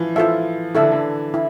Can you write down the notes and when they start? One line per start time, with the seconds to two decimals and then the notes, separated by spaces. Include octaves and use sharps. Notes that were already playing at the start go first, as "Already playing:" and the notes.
Already playing: E3 F3
0.16 F3 F4 A4 E5
0.75 D3 E4 A4 E5
0.83 E3
0.91 D3
1.34 E4